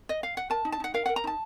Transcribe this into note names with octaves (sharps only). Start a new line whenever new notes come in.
D#5
F5
F#5
A#4 A5
D#4
A5
D#4 F#5
A#4 F5
A#4 F#5
A#5
D#4 A5